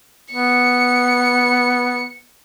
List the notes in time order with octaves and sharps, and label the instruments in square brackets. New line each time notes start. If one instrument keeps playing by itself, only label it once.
[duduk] B3 [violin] C#7